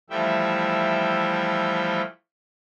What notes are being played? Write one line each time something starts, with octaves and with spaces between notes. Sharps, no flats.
E3 F3 G3 A3 E5 G5